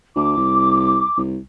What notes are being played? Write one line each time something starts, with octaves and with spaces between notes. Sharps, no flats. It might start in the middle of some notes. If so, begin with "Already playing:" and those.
D2 D6
C2
C2